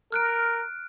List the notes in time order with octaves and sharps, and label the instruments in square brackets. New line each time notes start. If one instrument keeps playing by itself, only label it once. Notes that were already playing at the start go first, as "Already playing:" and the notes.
[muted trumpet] A#4 [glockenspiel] F6 F#6 D7